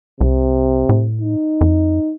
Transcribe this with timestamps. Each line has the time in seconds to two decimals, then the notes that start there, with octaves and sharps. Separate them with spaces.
0.21 C2 C3
0.89 A2
1.21 D#4
1.61 F2